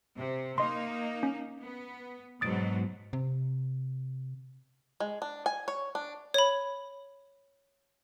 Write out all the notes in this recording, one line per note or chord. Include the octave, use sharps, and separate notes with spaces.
C3
A#3 D#4 D#5 C6
C#4
B3
G#2 B2 F#3 D#6 A6 D7
C3
G#3
D4
G#5
C#5
D4
C#5 B5